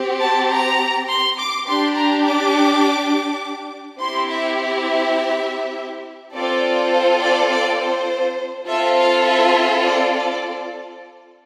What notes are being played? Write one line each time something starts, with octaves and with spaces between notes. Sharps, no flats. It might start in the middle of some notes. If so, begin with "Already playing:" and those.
Already playing: C4 G4
A5
A#5
C6
D6
D4 G4 C6
A#5
D6
C4 E4 G4 C6
E5
E5
C4 F4 A4 D5
C5
D5
D5
C5
C4 F4 A4 E5
F5
E5
D5
D5